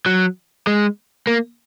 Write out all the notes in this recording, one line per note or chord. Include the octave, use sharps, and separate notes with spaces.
F#3
G#3
A#3